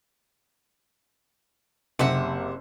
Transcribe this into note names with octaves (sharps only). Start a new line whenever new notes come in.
F#1 C3 E5 F#5